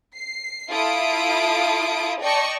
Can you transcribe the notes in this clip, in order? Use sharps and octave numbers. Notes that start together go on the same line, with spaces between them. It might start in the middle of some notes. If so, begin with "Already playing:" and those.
C7
E4 F4 A4 D#6 D7
D5 D#5 G5 A5 C#6 C#7